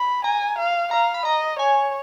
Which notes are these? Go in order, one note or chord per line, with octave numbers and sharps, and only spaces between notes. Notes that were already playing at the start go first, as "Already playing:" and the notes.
Already playing: B5
G#5 A#5
F5
F5 A#5
B5
D#5 A#5
C#5 G#5